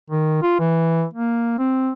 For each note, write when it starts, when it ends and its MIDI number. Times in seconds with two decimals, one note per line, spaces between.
0.10 0.40 51
0.43 0.56 65
0.60 1.04 52
1.13 1.57 58
1.59 1.91 60